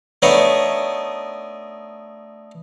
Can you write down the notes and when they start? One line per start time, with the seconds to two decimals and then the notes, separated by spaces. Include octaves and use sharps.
0.22 A3 B3 D4 D#4 C#5